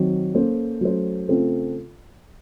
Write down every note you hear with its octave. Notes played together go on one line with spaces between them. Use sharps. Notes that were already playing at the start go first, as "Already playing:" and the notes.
Already playing: D#3 F#3 C4
A#3 C#4 A4 C5
F#3 A3 C#4 A4 C5
C#3 A3 C4 F4 A4